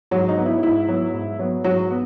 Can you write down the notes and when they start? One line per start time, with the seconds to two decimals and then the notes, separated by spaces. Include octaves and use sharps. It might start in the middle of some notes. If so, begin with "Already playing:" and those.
0.11 G#2 F#3 F#4
0.29 D#4
0.37 F#3 B3
0.46 E4
0.63 G#2 E4
0.88 F#3 B3
1.14 G#2
1.39 F#3 B3
1.64 G#2 F#3 F#4
1.90 B3